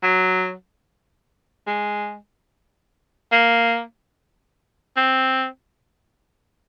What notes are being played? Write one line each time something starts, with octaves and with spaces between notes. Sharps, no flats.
F#3
G#3
A#3
C4